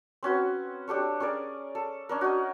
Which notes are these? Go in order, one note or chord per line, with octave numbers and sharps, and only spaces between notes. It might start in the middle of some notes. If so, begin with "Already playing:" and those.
C4 C#4 F#4 B4
D4 G4 A4 C#5
C#4 G#4 A#4 D5
A4
C#4 D4 A#4
D#4 F#4